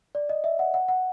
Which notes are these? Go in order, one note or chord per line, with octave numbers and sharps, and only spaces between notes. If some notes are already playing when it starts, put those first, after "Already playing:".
D5
D#5
E5
F#5
F#5
F#5